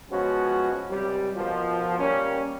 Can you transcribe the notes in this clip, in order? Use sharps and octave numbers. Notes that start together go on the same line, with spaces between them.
F3 G#3 B3 C#4 F#4
C#2 C3 G3
B2 D#3 F3
G3 A#3 C#4